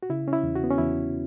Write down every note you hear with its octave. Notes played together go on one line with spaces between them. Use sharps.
F#4
C#3 E4
C#4
E4
E2
F#4
B3
C#4
E2 E4